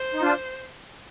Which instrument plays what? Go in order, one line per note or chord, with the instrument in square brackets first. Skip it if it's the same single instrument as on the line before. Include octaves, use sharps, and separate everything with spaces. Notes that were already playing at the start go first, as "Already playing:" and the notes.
Already playing: [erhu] C5
[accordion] D#4
D4 F4